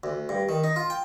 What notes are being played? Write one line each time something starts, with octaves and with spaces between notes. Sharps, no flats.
D2
G2
D#3
D#4
F4
G5